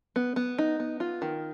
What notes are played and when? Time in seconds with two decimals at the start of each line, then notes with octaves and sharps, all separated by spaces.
0.16 B3
0.36 B3
0.58 D#4
0.80 B3
1.00 F4
1.22 D#3